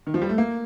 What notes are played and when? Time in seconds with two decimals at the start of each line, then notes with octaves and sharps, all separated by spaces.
0.07 D#3
0.14 F3
0.22 G3
0.29 A3
0.38 A#3